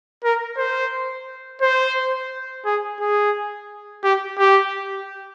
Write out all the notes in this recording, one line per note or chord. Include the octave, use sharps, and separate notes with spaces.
A#4
C5
C5
G#4
G#4
G4
G4